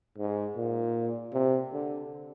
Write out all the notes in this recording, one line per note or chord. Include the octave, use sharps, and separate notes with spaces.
G#2
A#2
C3
D3